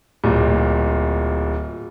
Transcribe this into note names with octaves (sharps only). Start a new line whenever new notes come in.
D1 A#2